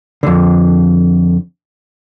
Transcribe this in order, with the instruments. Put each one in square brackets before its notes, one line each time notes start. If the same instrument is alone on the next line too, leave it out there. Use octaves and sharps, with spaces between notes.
[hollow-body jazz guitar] F2 D3